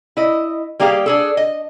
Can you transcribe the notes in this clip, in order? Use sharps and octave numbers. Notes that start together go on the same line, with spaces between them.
E4 D#5
G3 A#3 G4 G#4 F5
D4 G#4 A4
D#5